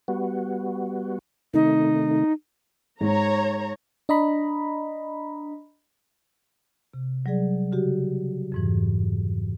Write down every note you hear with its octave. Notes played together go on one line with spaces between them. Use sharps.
G3 B3 F#4
C3 D#3 A3 D#4
G#2 C#5 A#5
D4 D#5 A#5 B5
C3
F#3 G3 G#4 D5
C#3 F#4 G4
F2 G#2 E3